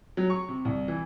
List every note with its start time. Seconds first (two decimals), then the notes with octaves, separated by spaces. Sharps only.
0.17 F#3
0.30 C#6
0.49 C3
0.65 C2
0.88 E3